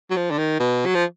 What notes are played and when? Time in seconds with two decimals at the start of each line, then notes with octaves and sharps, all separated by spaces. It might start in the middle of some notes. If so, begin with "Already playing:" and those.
0.10 F#3
0.16 F3
0.31 D3
0.38 D#3
0.60 B2
0.86 F#3
0.95 F3